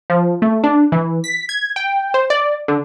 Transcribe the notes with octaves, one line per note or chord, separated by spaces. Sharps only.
F3
A3
D4
E3
B6
G#6
G5
C5
D5
D3